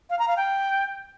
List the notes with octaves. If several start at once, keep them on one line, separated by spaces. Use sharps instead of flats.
F5
A#5
F5
G5